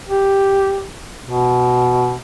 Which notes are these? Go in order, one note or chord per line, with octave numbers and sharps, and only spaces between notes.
G4
B2